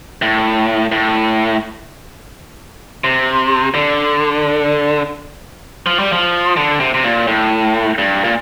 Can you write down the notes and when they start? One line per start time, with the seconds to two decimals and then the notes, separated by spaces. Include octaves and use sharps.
0.22 A2
0.92 A2
3.04 C3
3.74 D3
5.86 F3
5.99 G3
6.12 F3
6.57 D3
6.80 C3
6.94 C3
7.04 A#2
7.27 A2
7.98 G2
8.24 A#2